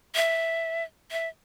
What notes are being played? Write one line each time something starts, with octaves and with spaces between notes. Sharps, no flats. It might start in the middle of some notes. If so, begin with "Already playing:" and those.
E5
E5